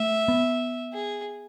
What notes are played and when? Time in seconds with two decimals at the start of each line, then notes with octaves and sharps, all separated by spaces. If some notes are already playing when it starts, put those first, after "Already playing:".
Already playing: A3 E5
0.28 B3
0.93 G#4